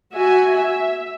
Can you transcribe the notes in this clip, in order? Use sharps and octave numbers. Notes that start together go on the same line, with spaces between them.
F#4 E5 G#5
E5